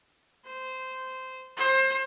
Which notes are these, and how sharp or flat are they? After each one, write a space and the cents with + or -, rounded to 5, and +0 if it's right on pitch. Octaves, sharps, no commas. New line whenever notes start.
C5 -15
C5 +25